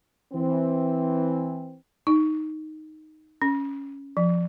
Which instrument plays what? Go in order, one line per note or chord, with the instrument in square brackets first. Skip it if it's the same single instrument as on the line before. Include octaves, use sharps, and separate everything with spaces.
[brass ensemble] E3 C4
[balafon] D#4
C#4
F3